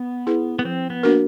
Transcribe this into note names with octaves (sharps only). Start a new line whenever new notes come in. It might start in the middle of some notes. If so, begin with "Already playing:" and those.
Already playing: B3
E4 G#4 B4
B3
F3 C4
B3
A#3 D4 F#4 A#4